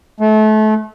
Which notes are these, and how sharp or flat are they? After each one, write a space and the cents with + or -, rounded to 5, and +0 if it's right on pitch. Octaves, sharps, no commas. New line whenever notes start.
A3 -30